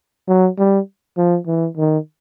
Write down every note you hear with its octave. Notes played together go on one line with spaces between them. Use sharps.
F#3
G3
F3
E3
D#3